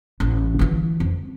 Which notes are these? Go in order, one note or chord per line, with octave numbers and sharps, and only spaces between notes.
A1
E3 F4
F2